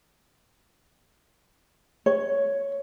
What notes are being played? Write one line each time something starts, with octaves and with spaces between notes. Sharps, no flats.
C#5